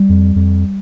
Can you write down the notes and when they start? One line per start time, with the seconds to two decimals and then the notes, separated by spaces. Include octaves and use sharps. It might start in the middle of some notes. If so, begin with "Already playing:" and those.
Already playing: G3
0.09 F2
0.36 F2